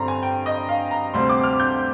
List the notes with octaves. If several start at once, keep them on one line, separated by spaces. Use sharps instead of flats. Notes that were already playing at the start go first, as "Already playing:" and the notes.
Already playing: G2 D3 G3 C4 A#5 C6
G#5
G5
D#5
F5
A#5
D2 C3 G3 C4 C6
D6
F6
G6